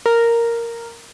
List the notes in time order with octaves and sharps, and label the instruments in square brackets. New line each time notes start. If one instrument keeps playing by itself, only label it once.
[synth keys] A#4